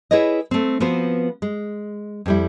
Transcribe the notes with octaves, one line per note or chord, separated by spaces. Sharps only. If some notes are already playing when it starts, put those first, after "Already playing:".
E4 G#4 B4 C#5 D#5
A3 C4
F3 B3 C4 F#4 B4 C5
G#3
F2 G3 E4